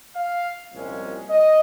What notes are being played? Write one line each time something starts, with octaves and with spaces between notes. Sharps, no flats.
F5
C2 A#2 F3 G#3 C#4
D#5